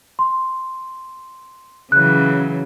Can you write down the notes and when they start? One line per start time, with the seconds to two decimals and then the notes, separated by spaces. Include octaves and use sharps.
0.19 C6
1.92 C#3 E3 F#3 F#6